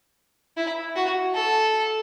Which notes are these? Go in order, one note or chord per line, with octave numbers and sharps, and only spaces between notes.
E4
F#4
A4